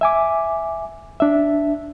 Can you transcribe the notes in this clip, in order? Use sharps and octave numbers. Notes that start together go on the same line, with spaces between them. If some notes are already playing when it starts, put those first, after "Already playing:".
E5 G#5 D6
D4 E5